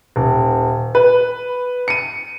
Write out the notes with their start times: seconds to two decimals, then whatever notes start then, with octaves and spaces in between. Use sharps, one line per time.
0.16 D#1
0.95 B4
1.88 C#7 D#7